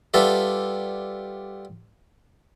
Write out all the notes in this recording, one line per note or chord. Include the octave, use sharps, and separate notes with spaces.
G3 B3 F4 A4 E5